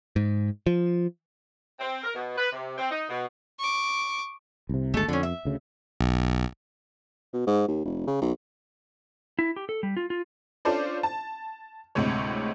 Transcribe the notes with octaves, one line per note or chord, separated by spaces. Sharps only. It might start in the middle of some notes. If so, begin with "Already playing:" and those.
G#2
F3
C4
A#4
B2
B4
C3
C4
D#4
B2
C#6 D6
C2 C3
G#1 D2 G#3 A3 A4
F2 D3 C#4
E5
D2 C#3
B1
B2
G#2
D#2
F1
C#3
B1
E4
G4
A4
G3
F4
F4
C#4 D4 F4 A4 C5 D5
A5
D2 A2 C3 G#3 C#5